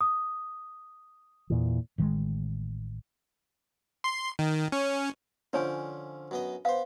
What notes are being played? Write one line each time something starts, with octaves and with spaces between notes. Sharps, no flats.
D#6
E2 A#2 E3
A1 D#3 E3 G#3
C6
D#3
C#4
D3 F3 C#4 D4 C#5 G#5
F#2 B3 D#5
B3 C5 F5